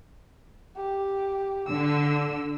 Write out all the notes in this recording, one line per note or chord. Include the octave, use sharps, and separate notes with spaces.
G4
D3 E6